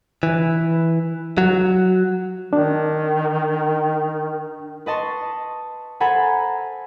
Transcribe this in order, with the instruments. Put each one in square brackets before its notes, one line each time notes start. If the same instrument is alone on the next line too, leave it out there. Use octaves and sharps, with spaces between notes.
[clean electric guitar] E3
F#3
[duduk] D#3 [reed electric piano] D4
[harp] B4 D#5 A5 C6 C#6
A4 C5 F#5 G#5 A#5 B5